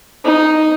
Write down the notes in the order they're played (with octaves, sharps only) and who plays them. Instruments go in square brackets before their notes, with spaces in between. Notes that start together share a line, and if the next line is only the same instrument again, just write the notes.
[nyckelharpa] D#4